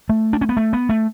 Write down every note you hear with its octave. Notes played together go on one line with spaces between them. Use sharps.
A3
D4
C#4
B3
A3
B3
A3